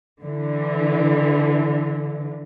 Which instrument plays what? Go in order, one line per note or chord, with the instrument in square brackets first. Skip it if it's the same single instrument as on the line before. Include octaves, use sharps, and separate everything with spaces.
[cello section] D3 E3